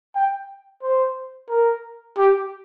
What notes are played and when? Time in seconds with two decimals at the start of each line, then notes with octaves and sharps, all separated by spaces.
0.15 G5
0.83 C5
1.50 A#4
2.18 G4